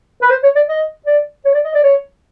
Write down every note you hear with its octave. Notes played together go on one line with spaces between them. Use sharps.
B4
C5
C#5
D5
D#5
D5
C#5
D5
D#5
D5
C#5